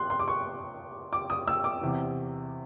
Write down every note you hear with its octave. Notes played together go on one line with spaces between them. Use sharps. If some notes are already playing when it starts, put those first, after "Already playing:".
Already playing: C6 F#6
C6
D6
C#6
D6
D#6
E6
D6
E2 C3 E3